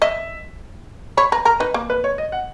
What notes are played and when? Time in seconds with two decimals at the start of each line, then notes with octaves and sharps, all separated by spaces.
0.02 D#5 E5
1.17 C#5 B5
1.32 B4 A#5
1.45 A#4 A#5
1.60 D#4 B4
1.74 A#3
1.90 B4
2.04 C#5
2.18 D#5
2.32 F#5